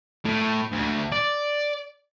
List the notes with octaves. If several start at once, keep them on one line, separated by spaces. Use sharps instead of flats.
A2
D2
D5